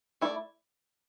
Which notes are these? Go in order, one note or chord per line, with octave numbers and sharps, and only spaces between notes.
A3 E4 A#4 D5